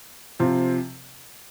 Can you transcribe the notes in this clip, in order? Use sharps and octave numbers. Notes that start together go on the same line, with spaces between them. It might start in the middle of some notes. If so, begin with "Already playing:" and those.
C3 F3 C4